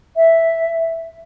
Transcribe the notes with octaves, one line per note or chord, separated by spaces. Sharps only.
E5